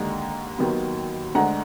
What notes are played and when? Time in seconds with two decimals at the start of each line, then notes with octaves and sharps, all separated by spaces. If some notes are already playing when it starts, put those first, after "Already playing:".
Already playing: D#2 D3 G#3 F#5 A#5
0.59 D#2 D#3 F#3 B3
1.34 D2 D3 G#3 F#5 A#5